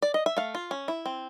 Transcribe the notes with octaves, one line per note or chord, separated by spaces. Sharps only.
D5
D#5
E5
A3 F5
F4
C#4
E4
C4